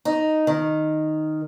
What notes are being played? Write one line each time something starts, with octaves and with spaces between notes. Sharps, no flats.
D#4
D#3